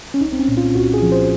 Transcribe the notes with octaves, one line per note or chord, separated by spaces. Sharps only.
C#4
C2 D#4
C4
C#4
A#2
F4
C2 F#4
G#4
F3
C5